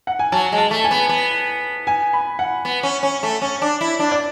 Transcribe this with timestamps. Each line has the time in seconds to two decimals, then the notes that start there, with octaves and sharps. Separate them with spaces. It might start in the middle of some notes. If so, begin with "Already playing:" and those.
0.07 F#5
0.19 G#5
0.32 F#3 A5
0.52 G#3
0.58 A5
0.71 A3
0.84 G#5
0.91 B3
1.09 B3
1.87 G#5
2.13 B5
2.39 F#5
2.65 B3
2.83 C#4
3.03 C#4
3.23 A3
3.42 C#4
3.62 D4
3.81 E4
3.99 D4
4.11 D5